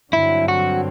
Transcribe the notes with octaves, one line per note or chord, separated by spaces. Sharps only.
G2 D3 F#3 C4 E4
F#4